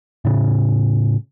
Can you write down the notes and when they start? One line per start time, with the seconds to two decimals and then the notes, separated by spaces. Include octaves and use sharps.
0.25 A2 C#3